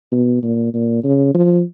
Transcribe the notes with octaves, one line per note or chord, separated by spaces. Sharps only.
B2
A#2
A#2
C#3
F3